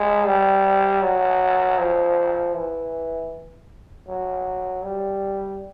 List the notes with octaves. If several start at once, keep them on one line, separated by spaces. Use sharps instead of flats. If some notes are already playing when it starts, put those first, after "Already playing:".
Already playing: G#3
G3
F#3
F3
E3
F#3
G3